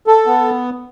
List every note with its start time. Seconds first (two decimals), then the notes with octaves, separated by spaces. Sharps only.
0.07 A4
0.27 B3